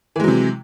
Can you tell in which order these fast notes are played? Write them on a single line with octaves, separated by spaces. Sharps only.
E3 G#3 F#3 C3